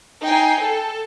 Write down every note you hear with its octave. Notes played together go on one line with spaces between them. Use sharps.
D#4 G5 G#5 C7
A4